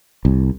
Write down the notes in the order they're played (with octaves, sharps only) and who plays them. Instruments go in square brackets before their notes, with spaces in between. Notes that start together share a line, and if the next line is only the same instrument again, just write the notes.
[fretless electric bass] C2